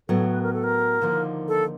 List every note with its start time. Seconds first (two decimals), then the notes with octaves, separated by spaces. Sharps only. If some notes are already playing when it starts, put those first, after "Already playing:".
0.08 A2 F#3 B3 A4
0.32 B4
0.43 A#4
0.53 A4
0.64 A#4
1.01 D#2 D3 F3 A#3 D#4
1.48 A4